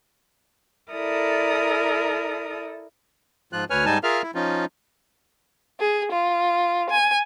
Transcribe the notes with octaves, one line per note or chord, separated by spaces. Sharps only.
E4 A4 A#4 D5 D#6
G#2 F3 F4 F#6
D2 B4 C#5 G#5 F6
G#2 G3 D#4 G#5 A5
F4 G#4 A#4 E5 F5 F6
E4
F3 C#4 D#4 F4
G#4
F4
G#5